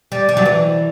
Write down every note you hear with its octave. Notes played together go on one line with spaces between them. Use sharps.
G3
G3
F#3
E3